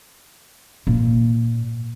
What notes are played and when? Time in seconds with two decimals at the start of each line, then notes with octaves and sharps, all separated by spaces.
0.87 A#2